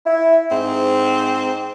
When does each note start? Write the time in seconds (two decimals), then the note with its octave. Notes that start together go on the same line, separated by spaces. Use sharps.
0.06 E4
0.51 G#2 C4